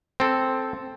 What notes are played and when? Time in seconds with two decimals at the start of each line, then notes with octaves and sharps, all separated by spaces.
0.20 C4 A4